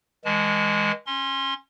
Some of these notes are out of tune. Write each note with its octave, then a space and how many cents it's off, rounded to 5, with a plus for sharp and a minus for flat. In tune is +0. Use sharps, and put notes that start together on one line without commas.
E3 -40 G#3 -15 A5 -40
C#4 -20 C6 +20